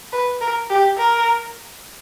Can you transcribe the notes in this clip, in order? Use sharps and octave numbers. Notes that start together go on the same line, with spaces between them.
B4
A#4
G4
A#4